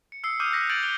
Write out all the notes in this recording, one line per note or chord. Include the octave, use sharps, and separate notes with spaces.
C#7
D#6 E6 C7 C#7
D6 D#6 F6 G6 D#7
E6 F#6 A#6 B6
G6 A6 D7 D#7 F7 F#7
G6 G7